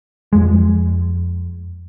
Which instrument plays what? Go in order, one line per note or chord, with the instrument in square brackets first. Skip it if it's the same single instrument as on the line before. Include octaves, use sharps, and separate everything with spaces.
[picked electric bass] F2 G#3